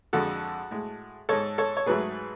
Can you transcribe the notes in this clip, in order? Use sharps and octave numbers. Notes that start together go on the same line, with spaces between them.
F2 D3 G#3 F#4 A4
A2 G#3
G#2 G#3 A4 C#5
A4 C#5
C#5
G#2 F#3 A3 G#4 B4